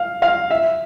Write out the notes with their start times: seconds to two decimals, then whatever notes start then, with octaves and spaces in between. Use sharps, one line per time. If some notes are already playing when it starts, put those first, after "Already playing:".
Already playing: F5
0.22 F5
0.51 E5